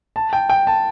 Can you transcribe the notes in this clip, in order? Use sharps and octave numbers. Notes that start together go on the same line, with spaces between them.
A5
G5
G5
A5